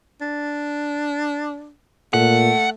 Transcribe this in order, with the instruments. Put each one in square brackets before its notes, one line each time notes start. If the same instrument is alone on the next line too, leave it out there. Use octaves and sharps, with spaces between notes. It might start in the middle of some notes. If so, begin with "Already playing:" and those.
[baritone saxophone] D4
[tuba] A#2 [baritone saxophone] A3 [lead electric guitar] F#5